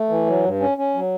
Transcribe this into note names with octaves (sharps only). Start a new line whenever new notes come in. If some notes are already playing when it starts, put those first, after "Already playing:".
Already playing: A3
E3
F#3
G2
C#4
C#4
F#3